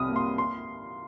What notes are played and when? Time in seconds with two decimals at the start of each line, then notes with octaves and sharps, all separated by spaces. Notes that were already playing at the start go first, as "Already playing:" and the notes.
Already playing: C2 C3 D#6 F6
0.09 A#3
0.16 C6
0.38 C6